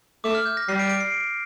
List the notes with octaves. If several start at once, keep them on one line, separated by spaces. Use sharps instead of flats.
A3 D6
F6
G6
A#6
G3 C7
D7
D7
C7
D7